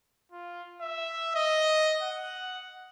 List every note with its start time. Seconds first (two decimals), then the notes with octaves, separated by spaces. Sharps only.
0.32 F4
0.81 E5
1.35 D#5
2.03 F#5